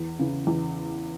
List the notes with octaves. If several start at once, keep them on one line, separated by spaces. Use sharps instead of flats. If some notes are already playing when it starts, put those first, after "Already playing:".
Already playing: E2
C#3 E3
E2